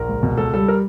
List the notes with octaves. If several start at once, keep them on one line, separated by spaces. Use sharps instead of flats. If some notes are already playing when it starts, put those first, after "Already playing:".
Already playing: A#1 A#4
C#2
B2
C#2 A4
G3 A4
A#4